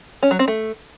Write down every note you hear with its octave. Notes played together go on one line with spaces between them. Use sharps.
C#4
F#3
C4
A3